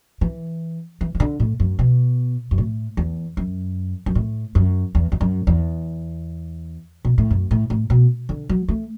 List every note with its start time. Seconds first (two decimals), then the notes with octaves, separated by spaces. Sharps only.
0.21 E3
1.01 E3
1.15 E3
1.20 D3
1.40 A2
1.60 F#2
1.79 B2
2.51 F#2
2.58 A2
2.97 E2
3.37 F#2
4.06 F#2
4.15 A2
4.55 F#2
4.95 E2
5.12 E2
5.21 F#2
5.47 E2
7.05 B2
7.18 A2
7.31 F#2
7.51 A2
7.70 A2
7.90 B2
8.29 D3
8.49 F#3
8.68 A3